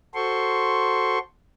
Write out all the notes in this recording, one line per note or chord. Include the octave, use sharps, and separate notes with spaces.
F#4 A4 C5 C6 C#6